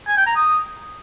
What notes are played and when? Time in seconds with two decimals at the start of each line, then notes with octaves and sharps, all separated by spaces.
0.08 G#5
0.17 G5
0.26 A#5
0.36 D#6